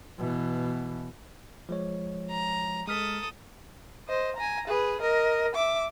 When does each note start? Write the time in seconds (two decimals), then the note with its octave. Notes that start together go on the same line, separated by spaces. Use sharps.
0.18 B2 E3
1.69 F3 G#3 C#5
2.30 A#5
2.88 G#3 A4 D#6 F6 B6
4.08 C5 D#5
4.36 G#5 A#5
4.68 G#4 B4
5.01 A#4 D#5
5.55 E5 D6